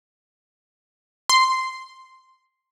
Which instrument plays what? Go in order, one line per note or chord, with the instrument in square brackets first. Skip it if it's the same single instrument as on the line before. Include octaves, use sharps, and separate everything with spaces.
[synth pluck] C6